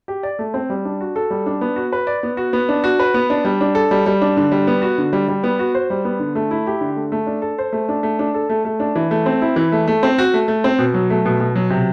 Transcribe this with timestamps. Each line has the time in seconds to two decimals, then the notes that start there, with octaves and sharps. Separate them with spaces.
0.08 G4
0.23 D5
0.39 A3
0.54 C4
0.70 G3
0.85 D4
1.01 F#4
1.16 A4
1.30 G3
1.46 D4
1.61 B3
1.76 F#4
1.92 B4
2.07 D5
2.23 B3
2.37 F#4
2.53 B3
2.69 D4
2.84 F#4
2.99 B4
3.14 B3
3.30 D4
3.45 G3
3.61 D4
3.75 A4
3.91 G3
4.06 G3
4.22 D4
4.37 D3
4.52 G3
4.67 B3
4.82 F#4
4.98 D3
5.13 G3
5.28 G3
5.44 B3
5.59 F#4
5.75 C5
5.90 G3
6.05 B3
6.20 D3
6.35 A3
6.51 E4
6.67 G4
6.81 D3
6.96 A3
7.12 A3
7.27 D4
7.42 A4
7.58 C5
7.73 A3
7.89 D4
8.03 A3
8.19 D4
8.34 A4
8.50 A3
8.65 A3
8.80 D4
8.95 E3
9.11 A3
9.26 C4
9.42 E4
9.56 E3
9.72 A3
9.88 A3
10.03 C4
10.18 F#4
10.34 A3
10.48 A3
10.64 C4
10.78 B2
10.94 F#3
11.10 A3
11.26 B2
11.40 B2
11.55 F#3
11.70 C3